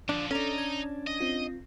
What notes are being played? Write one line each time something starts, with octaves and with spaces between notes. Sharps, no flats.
D3 F3 D4
C#4 D4 A4 D#5 A#5
G#6
D#5
C4 F4